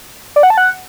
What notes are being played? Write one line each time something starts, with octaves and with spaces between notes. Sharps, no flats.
D5
F#5
A5
F#5